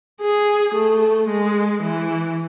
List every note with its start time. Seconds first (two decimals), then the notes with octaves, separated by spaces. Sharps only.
0.21 G#4
0.75 A3
1.29 G#3
1.83 E3